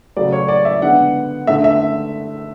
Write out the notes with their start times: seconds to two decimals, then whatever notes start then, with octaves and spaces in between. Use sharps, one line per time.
0.16 C#3 F#3 A3 D5
0.32 C#5
0.48 D5
0.65 E5
0.82 D3 G#3 B3 F#5
1.47 D3 A3 E5
1.64 E5